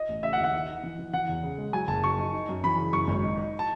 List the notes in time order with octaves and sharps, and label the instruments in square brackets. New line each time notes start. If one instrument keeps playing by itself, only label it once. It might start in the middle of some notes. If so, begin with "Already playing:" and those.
Already playing: [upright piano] D#5
[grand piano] A1
[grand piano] C#3 [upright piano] E5
[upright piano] F#5
[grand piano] D#2
[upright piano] F#5
[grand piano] D#4
D#4
E3
E3
[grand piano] E3 [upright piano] F#5
[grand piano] E2
C#3
G#3
[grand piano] F#3 [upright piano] G#5
[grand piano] F#1 [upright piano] A5
[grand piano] F#3 [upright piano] C#6
[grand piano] D#4
D#4
F#2
[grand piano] E3 [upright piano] B5
[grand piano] C#3
[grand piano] F#2 [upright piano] C#6
[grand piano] G#1
D#4
D#4
[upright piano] A5